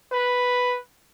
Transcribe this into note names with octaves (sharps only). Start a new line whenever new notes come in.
B4